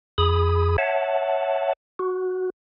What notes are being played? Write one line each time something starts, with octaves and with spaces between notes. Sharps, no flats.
F2 G#4 B5 D#6
C#5 E5 F#5 A5
F#4